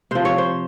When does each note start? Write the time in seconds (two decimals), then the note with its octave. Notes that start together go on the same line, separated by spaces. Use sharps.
0.11 C3 F3 C5
0.25 C#5
0.38 C5